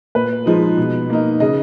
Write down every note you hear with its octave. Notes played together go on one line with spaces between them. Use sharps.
A#2 B4
F3 G#3 D#4
B2
A#3 D#4
C#3 D#5